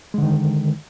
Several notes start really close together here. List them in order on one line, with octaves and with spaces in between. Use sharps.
G#3 D3 D#3